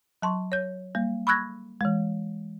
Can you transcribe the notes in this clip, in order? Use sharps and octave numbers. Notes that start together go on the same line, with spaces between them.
F#3 A5 C6 C#6
C#5 G6
G3 A#3
B5 C#6 E6 F#6 G#6 A#6
E3 G#3